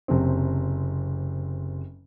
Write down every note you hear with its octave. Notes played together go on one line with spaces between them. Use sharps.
F#1 C3 C4